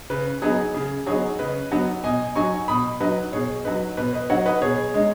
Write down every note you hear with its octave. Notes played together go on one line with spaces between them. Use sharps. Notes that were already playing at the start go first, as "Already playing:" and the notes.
C#3 B4
F#3 B3 D#4 G#4
C#3 G#4
F#3 B3 D#4 G#4 C#5
C#3 B4 D#5
F#3 B3 D#4
B2 D#5 G#5
F#3 D#4 G#5 C#6
B2 B5 D#6
F#3 D#4 B4 D#5
B2 G#4 C#5
F#3 D#4 B4
B2 B4
B4 D#5
F#3 D#4 C#5 F#5
B4 D#5
B2 G#4 C#5
G#3 D#4